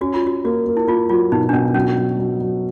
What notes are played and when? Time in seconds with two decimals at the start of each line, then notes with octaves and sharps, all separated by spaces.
0.01 C#4 F#4
0.14 F4
0.23 C#4 F#4
0.44 A#3 F#4
0.66 A#3
0.77 E4
0.88 A#3 F4
1.09 F#3 F4
1.32 B2 D#4
1.49 D4
1.53 B2 C#4
1.74 F#3 C#4
1.97 F#3
2.18 F#3
2.41 F#3